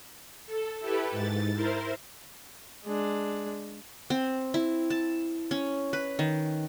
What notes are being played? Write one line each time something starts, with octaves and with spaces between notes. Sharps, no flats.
A4
E4 G4 A4 B4
G#2 A6
E4 A#4 C5
G#3 D4
C4
E4
A5
C#4
B4
D#3